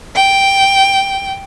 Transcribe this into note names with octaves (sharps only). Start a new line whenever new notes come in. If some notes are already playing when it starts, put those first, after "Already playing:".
G5